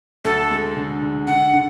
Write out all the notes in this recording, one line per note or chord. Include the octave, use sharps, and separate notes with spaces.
D2 A4
G#3
D3
D3
D3 F#5
D3